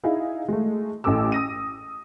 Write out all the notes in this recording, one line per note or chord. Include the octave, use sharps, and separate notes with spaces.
D#4 E4 G#4 F5
G#3 A3
A1 A2 A4 D6 E6
D#6 A#6 D#7